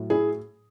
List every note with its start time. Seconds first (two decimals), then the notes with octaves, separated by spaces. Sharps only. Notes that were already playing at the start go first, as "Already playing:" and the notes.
Already playing: A2 F#3
0.10 E4 G#4